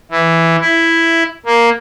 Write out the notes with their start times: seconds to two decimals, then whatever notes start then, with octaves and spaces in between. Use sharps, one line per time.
0.11 E3
0.61 E4
1.46 A#3